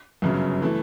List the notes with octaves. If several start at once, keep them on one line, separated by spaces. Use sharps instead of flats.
G1 F#2 C#3
E3 A3